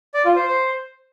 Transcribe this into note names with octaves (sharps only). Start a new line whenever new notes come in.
D5
F4
C5
C5